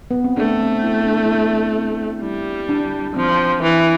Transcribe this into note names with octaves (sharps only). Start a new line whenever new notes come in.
B3
C4
A3 D4
C4
E4
D4
E4
D4
C4
C4
G3 E4
D4
F3 C4
E3 E4